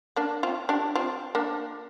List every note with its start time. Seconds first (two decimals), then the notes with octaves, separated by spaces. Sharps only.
0.16 A#3 D4
0.43 C4 F4
0.69 D4 G4
0.95 C4 F4
1.35 A#3 D4